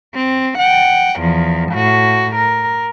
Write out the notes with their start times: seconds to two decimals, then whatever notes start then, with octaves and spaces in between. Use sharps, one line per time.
0.14 C4
0.59 F#5 G5
1.20 E2 F3
1.73 A2 F#4
2.36 A#4